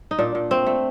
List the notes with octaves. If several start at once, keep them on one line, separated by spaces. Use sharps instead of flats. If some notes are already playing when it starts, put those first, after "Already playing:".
D#4
A#2 D4
A#2
A3 C4
A3